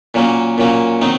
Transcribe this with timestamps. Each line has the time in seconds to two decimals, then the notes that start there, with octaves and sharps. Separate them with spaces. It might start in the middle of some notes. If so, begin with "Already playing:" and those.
0.14 A#2 F#3 A#3 C#4
0.58 A#2 F#3 A#3 C#4
1.01 D#3 F#3 C4 D#4